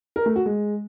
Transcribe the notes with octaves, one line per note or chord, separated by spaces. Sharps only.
A#4
A3
F#4
G#3